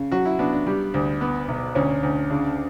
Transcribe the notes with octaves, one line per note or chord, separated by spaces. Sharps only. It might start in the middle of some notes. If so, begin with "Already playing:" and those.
Already playing: C#3
F#3 F#4
E4
B3 D4
D4
G3
D2
B3
B1
D2 C#4
D2
C#3 D4